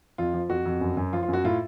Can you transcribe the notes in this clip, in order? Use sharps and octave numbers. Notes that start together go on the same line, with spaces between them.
F2 F4
F3
F2 F#4
F2
F#2
F#2
F3 F4
F4
F#2 F#4
A2 F4